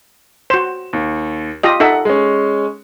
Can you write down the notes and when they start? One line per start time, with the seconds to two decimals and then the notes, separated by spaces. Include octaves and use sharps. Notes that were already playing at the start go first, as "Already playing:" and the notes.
0.50 F#4 C5 E7
0.93 D#2
1.63 F4 G4 D#5
1.80 D#4 A4 E5 F#5
2.05 G#3 C#4